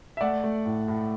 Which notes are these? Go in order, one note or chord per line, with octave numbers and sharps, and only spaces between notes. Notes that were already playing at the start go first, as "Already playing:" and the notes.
E5
A3 D5 F#5
A3
A2
A2